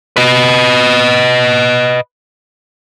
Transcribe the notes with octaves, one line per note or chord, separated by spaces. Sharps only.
B4 D#5